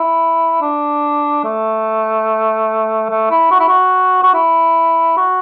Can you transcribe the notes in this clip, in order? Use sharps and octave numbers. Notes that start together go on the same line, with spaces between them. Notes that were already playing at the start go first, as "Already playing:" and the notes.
Already playing: E4
D4
A3
A3
E4
F#4
E4
F#4
F#4
E4
F#4